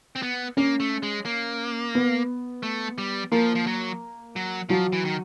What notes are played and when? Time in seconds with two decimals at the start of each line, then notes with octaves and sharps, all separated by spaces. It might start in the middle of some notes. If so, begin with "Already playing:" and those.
0.16 C4
0.22 B3
0.57 A#3 C#4
0.80 A3
1.03 G#3
1.25 A#3
1.95 B3
2.63 A3
2.98 G3
3.32 F3 A#3
3.55 F3
3.67 F#3
4.36 F#3
4.69 F3 F#3
4.93 E3
5.05 D#3